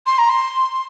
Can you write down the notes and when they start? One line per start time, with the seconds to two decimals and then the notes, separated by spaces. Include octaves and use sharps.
0.06 C6
0.18 A#5
0.30 C6